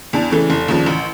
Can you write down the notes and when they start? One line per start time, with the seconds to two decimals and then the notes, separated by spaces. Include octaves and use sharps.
0.13 E2 D4
0.31 C#3 E3 A3
0.50 F1
0.68 D#2 C#3 F3
0.86 A1